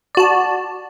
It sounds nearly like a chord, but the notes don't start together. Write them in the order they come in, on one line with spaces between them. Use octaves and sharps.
D5 F#4 A5